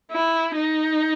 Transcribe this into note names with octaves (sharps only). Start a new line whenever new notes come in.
E4
D#4